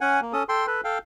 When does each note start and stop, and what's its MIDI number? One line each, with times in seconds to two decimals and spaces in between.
0.01 0.20 61
0.01 0.20 78
0.01 0.20 80
0.22 0.33 58
0.33 0.43 61
0.33 0.43 69
0.33 0.43 87
0.49 0.66 69
0.49 0.66 79
0.49 0.66 84
0.67 0.81 69
0.67 0.81 71
0.84 0.98 69
0.84 0.98 77
0.84 0.98 79